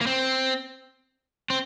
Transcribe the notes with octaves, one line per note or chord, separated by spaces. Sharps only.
A#3
C4
C4